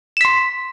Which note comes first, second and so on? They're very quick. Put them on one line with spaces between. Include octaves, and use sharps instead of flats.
E7 B6 C6